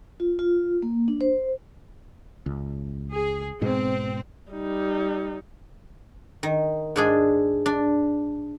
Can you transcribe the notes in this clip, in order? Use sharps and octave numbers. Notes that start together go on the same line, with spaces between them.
F4
F4
A#3
D4
C5
C#2
G#4
G#2 B2 G#3 C4
G3 D#4
D#3
G#2 D4 G#4
D4